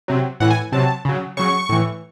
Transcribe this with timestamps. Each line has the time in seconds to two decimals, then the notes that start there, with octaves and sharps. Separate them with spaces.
0.08 C3 F#3
0.40 A2 E3 F#5
0.51 G#5
0.72 C3 F#3 A5
1.05 C#3 F#3
1.37 C#3 F#3 C#6
1.69 A2 E3